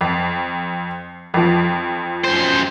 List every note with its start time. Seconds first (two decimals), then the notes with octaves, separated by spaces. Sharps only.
0.01 F2
1.34 F2 F3
2.24 F#2 C5